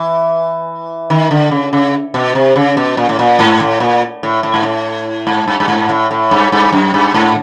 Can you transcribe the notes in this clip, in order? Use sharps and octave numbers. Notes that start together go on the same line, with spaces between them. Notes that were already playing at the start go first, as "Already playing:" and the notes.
Already playing: E3
D#3
D3
C#3
C#3
B2
C3
C#3
B2
A#2
A2
A#2
G#2
A2
A#2
A2
A2
G#2
A2
G#2
G2
G2
G#2
A2
A2
G2
G2
F#2
G2
G#2